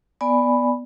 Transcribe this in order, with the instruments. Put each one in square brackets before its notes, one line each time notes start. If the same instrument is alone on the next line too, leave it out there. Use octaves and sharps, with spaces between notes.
[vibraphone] B3 D5 G#5 B5